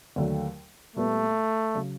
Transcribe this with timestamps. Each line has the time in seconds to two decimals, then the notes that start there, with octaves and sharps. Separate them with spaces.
0.16 D#2 D3 F#3 A3
0.96 A#2 G3 A3 B3
1.75 C#3 F#3